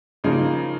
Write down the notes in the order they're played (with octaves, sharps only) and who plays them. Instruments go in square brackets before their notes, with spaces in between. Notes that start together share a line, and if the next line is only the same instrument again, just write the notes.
[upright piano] C#3 F3 A#3 D#4